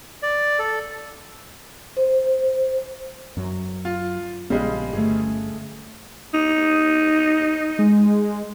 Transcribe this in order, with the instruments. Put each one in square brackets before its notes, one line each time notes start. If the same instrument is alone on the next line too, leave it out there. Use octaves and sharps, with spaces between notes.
[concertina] D5
A4
[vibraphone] C5
[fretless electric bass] F#2 F#3
[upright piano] F4
[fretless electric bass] A#1 B3 [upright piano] C#3 G3 G#3
[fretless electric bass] G1 [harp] A3 G#4
[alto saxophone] D#4
[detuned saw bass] G#3